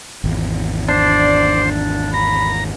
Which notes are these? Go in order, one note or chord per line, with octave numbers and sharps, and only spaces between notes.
G#1 E2
D4 C5 D5
A#5 B5